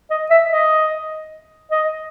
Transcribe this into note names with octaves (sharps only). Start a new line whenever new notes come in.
D#5
E5
D#5
D#5